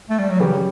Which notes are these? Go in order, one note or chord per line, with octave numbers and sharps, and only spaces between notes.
A3
G3
F#3
F#2 C#3 E3 G3 C#4 G4